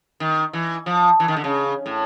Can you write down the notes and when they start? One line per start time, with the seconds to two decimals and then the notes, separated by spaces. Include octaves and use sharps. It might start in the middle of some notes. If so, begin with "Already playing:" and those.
0.20 D#3
0.53 E3
0.86 F3
1.20 E3
1.28 D#3
1.37 D3
1.44 C#3
1.86 A2